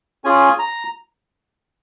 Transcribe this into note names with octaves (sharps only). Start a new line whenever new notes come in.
C#4 F4 G#4 G#5
A#5